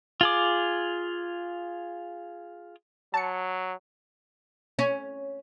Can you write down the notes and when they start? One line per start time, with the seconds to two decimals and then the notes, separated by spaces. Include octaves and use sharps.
0.21 F4 G#4 D6
3.14 F#3 A5 C#7
4.79 C#4